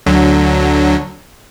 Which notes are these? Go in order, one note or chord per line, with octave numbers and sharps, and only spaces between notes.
D2 D3 F#3